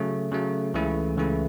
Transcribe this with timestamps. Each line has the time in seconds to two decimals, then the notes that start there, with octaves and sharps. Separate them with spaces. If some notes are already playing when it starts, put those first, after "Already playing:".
Already playing: C#3 F#3 A3
0.32 C#3 F#3 A3
0.74 C#2 C#3 E3 A3 E4
1.17 C#2 C#3 E3 A3 E4